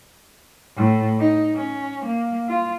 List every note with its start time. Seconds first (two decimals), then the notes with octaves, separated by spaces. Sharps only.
0.76 A2
1.19 D#4
1.55 C#4
2.05 A#3
2.48 F4